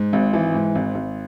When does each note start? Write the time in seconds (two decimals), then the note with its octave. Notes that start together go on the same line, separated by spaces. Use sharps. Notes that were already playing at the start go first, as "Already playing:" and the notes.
Already playing: G#2
0.13 G#1
0.33 E3
0.54 G#2
0.75 G#1
0.95 G#1